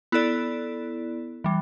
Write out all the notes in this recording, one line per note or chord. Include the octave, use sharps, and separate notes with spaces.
B3 E4 A4 D5
E3 G3